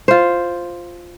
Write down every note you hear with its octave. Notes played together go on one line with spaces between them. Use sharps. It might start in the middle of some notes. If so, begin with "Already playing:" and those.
F4 C5